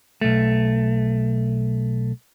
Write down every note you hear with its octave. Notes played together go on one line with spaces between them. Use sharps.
B1 A3